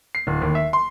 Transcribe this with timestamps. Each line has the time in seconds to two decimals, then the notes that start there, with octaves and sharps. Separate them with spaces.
0.15 C7
0.27 D1
0.42 D#2
0.55 E5
0.73 C6